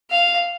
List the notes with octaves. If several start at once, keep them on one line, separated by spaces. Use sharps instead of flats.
F5